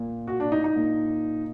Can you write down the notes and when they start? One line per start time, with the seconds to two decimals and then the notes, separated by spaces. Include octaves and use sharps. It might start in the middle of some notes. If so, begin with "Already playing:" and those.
Already playing: A#2
0.27 F#4
0.40 D4
0.52 D#4
0.64 D#4
0.76 A#2